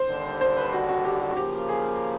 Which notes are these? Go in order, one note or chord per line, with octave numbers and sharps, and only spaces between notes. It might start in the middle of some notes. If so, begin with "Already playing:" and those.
Already playing: C5
D#2 D3 G3
C5
B4
F#4
F#4
G4
F#4
F#4
C#3 F3 A#3 G4
G#4